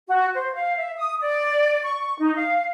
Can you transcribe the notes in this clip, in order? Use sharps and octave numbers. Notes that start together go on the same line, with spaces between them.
F#4
C5
F5
E5
D#6
D5
C#6
D#4
F5